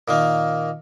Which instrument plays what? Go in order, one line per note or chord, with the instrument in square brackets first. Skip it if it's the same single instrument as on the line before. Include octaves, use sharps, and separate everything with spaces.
[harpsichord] A#2 D#3 A#3